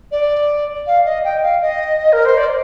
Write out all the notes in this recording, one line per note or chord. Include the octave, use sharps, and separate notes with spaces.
D5
F5
D#5
G5
F5
D#5
A#4
C5
D5